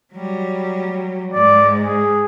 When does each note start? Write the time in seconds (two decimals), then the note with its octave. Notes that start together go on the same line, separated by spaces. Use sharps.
0.12 F#3 G3
1.34 G#2 G#3 D5
1.84 G#4